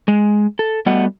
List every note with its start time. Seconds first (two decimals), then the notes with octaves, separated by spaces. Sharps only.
0.08 G#3
0.59 A4
0.86 G3 A3 B3 F#4 D#5 F#5